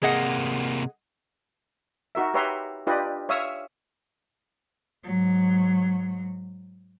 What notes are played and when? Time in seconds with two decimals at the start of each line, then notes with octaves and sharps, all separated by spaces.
0.03 C3 A#3 G#4 D#5 F#5
2.15 D#4 F#4 A#4 E5
2.34 G4 B4 C#5 E5 A#5 C6
2.87 D4 F4 G4 B4 D5 D#5
3.29 C#5 E5 F5 D#6 E6
5.03 G#2 F#3